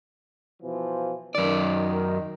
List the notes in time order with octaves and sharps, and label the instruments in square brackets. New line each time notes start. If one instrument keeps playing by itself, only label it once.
[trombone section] B2 E3 F3
[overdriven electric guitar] F#2 D5 [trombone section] D#3